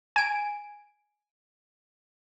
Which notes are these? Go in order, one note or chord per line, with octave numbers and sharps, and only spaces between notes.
G#5 D7